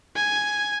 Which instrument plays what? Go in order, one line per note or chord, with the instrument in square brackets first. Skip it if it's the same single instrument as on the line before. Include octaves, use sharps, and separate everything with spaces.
[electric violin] G#5